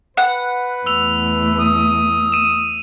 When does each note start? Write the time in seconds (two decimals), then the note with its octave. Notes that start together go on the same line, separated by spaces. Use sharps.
0.17 B4 F#5
0.86 E2 A3 E6 F7
1.60 D#6
2.32 D#7 E7